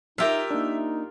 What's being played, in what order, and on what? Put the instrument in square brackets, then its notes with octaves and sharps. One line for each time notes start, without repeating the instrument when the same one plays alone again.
[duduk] D#4 [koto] F4 G4 A#4 [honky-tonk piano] E5
[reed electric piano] A#3 D4 [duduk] D#4